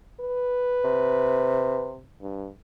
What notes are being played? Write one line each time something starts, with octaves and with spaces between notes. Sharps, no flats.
B4
C3
G2